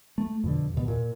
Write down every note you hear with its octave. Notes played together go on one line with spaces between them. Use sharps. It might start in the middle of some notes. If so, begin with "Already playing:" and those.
A3
F2 B2 D3
D#2 B2
A#2